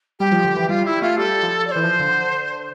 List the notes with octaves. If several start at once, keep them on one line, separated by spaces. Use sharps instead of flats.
G3 G4
F3
D3
E3
G3 F4
G3 E4
A3 F4
G3 A4
F3
D5
E3 C5
F3
D3